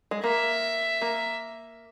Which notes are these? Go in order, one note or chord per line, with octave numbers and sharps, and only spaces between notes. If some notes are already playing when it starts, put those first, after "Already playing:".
G#3
A#3 E5
A#3